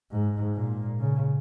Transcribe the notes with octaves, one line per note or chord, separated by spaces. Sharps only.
G#2
A#2
C#3